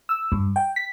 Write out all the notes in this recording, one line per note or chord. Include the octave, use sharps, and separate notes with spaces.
E6
G2
G5
B6